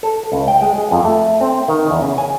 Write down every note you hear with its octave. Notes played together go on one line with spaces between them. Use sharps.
A4
C#2
G5
G#3
G#4
F2
A3
C4
D#3
E2
C#3
G#5